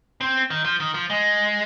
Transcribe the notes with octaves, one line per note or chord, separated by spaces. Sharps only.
C4
D#3
F3
D#3
F3
G#3